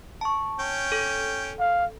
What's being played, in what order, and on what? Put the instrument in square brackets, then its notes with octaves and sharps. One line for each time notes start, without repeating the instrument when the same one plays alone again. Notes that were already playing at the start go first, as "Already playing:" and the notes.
[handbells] A5 C#6
[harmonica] C#4 G5
[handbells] A4
[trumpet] F5